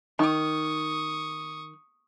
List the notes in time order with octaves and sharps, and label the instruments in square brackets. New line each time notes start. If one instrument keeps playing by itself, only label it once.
[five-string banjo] D#3 [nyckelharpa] C#6 D#6